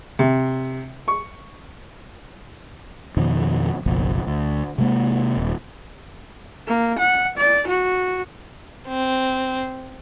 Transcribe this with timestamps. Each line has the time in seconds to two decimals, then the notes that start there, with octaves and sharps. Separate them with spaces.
0.19 C3
1.08 C#6
3.17 F2 B2 D#3
3.86 F#1 B1 F3
4.27 D2
4.78 C3 G#3 A#3
5.37 D#1
6.67 A#3
6.99 F#5
7.37 D5
7.67 F#4
8.88 C4